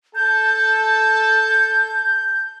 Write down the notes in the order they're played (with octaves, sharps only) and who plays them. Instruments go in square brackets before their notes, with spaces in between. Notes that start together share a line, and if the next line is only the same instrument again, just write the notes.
[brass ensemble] A4 A5 [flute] G6